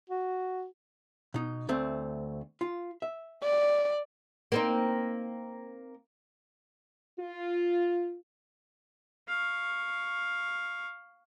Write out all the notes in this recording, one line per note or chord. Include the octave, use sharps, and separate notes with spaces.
F#4
B2 D#4
D2 A3 C4
F4
E5
D5
A#3 C4 D#4
F4
F5 C#6